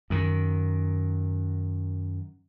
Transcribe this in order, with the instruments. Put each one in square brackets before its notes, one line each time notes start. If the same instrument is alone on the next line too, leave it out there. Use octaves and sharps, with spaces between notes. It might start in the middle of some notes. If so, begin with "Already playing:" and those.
[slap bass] F#2 D#3